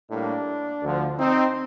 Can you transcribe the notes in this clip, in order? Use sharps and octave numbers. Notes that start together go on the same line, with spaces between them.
A2 G3 A#3 D4
D2 D3 F3
C4 D#4